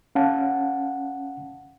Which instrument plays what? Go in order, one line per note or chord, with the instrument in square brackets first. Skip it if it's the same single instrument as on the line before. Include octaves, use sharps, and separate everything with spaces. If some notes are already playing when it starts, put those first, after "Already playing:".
[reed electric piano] C#4 F5 F#5 A5